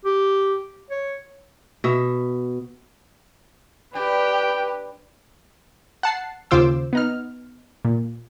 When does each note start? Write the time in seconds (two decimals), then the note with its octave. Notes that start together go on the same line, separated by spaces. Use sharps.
0.05 G4
0.90 C#5
1.84 B2 E5
3.95 D4 G4 B4 G5
6.03 F#5 A5 C7
6.51 D#2 C#3 F4 C5 D6 E6
6.93 B3 D#4 F6
7.85 A#2